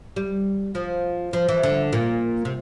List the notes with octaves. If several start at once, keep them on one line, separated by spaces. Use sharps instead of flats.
G3
F3
F3
E3
D3
A#2
C3